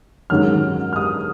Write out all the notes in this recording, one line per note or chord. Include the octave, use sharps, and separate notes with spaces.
G#2 D#3 F#3 C#4 F6
F6
D#6